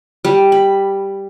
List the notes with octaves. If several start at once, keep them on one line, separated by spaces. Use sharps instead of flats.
G3
B5